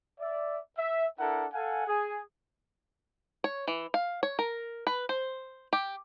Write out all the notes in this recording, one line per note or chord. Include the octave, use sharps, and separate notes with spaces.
D5 E5
E5
D4 E4 A4 A#4 F#5
A4 F5 F#5 G#5
G#4
C#5
E3
F5
C#5
A#4
B4
C5
G4